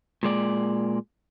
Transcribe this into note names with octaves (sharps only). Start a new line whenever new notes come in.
A#2 G#3 D5